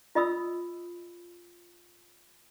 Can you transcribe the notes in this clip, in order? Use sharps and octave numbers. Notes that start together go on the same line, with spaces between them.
F4 D#5 B5 D#6 E6